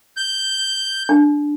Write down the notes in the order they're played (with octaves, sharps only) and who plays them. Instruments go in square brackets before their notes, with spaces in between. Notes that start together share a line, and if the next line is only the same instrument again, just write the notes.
[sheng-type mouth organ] G6
[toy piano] D4